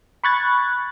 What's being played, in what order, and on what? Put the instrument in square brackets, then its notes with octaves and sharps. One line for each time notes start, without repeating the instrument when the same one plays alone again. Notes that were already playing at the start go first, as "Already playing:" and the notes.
[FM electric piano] B5 C#6 F#6 G#6 A6